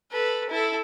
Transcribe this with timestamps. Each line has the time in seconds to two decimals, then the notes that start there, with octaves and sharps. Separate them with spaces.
0.11 A4 B4
0.50 E4 A4